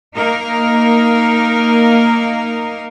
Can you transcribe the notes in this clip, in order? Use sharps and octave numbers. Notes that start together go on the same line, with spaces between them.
A#3 D#4 A#4